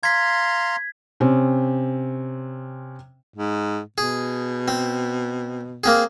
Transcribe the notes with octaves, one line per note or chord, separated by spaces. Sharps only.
F5 A#5 C6 G#6 B6
C3 C4 C#4
G#2
B2 G#4
C4
A#3 C4 G#4